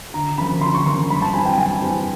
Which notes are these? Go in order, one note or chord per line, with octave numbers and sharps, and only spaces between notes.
D3 A#5
F3 A#3 C#4 B5
D3 C6
C#6
F3 A#3 C#4 C6
G2 B5
A5
E3 G3 C4 G#5
G5
G2 G#5
E3 G3 C4